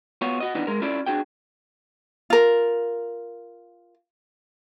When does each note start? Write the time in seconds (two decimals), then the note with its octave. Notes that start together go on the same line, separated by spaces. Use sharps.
0.22 B3 F4 F#4 C#5
0.40 F#4 D#5
0.55 E3 B3 D4 D#4
0.67 G#3 A#4
0.82 C#4 E4 F4 A4 D5
1.06 D4 F#4 G#4 G5
2.30 F4 A#4